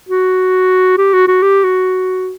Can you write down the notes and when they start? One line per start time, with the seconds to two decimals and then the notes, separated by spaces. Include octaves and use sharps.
0.09 F#4
0.98 G4
1.13 F#4
1.28 F#4
1.42 G4
1.64 F#4